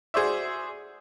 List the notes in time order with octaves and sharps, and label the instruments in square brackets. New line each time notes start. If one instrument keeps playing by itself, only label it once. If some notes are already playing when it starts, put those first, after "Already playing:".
[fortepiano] F#4 G#4 C5 D5 E5